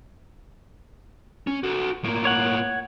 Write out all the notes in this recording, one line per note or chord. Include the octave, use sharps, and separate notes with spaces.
C#4
F#4 A4
A2 A#3
C#5 F#5